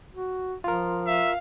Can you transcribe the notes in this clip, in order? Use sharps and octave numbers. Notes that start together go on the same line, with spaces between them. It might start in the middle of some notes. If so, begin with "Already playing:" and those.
F#4
F3 F4 A#4
E5 F5